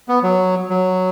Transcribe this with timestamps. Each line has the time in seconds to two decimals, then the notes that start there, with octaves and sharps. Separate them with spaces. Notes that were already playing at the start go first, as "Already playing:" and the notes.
0.09 B3
0.23 F#3
0.70 F#3